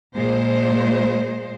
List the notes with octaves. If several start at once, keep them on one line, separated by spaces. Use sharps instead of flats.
A#2 G#3 C5